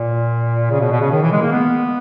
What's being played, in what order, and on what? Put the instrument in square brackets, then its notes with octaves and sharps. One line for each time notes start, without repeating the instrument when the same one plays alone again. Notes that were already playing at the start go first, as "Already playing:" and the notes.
Already playing: [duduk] A#2
C#3
B2
B2
C#3
D#3
E3
G#3
A#3
B3